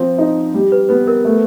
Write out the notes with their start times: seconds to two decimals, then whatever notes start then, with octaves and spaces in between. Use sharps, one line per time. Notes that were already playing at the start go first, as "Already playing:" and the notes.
Already playing: F3 C4
0.19 D#4
0.54 G3
0.72 B4
0.89 B3 B4
1.07 A#4
1.25 A3